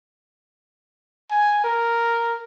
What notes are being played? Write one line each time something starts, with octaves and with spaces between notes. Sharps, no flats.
G#5
A#4